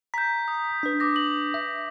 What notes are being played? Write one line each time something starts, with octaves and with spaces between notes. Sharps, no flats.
A#5 G6 B6
D#6
D4 B4
D6 D#6 A#6
F#7
E5